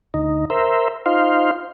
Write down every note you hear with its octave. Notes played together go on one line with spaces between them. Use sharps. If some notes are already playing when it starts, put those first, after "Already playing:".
D2 D#4
A#4 C5 E5
D#4 F4 C5 F5